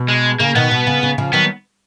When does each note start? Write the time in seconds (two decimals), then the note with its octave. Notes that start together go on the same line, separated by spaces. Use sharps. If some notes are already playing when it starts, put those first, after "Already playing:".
Already playing: B2
0.08 G#3
0.39 C#3 A#3
0.55 B2 D#3 B3
0.71 B2
0.87 C#3
1.03 C#3
1.18 C#3 F3
1.33 D#3 F#3 B3